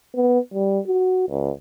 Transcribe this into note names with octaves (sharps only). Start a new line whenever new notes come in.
B3
G3
F#4
C#2